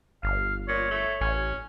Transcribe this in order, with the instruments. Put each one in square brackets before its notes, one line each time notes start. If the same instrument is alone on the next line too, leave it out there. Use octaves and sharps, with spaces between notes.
[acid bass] G1 [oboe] F5
[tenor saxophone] A#2 [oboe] C#5
[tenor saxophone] A3
[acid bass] A1 [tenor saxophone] C#4